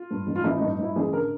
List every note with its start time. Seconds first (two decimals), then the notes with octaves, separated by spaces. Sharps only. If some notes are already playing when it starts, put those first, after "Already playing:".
Already playing: F4
0.11 G2
0.27 A1
0.36 F4
0.44 A1 E4
0.57 G2 D#4
0.71 D#4
0.79 G2 E4
0.96 A1 G#4
1.13 D3 A#4